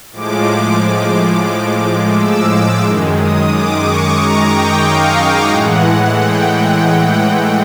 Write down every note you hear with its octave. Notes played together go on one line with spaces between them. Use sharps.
A2 F3 G#3 D6
D6
E6
D6
F#2 D#3 G#3
D#6
D6
C#6
A#5
G5
F5
A2 E3 G#3 F#5
G5
F#5